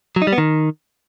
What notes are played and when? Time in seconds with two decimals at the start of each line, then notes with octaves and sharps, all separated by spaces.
0.16 F#3
0.22 D#4
0.27 G3
0.33 B3
0.38 D#3